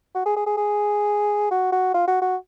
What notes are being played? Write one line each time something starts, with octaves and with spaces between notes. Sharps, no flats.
F#4
G#4
G#4
G#4
G#4
F#4
F#4
F4
F#4
F#4